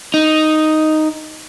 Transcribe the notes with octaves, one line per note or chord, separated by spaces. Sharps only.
D#4